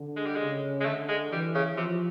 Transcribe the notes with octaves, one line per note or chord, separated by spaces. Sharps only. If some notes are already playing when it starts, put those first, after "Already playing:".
Already playing: D3
G#3
G3
C#3 G#3
G#3
D3 A3
G#3
E3 G3
C#3
C3 F3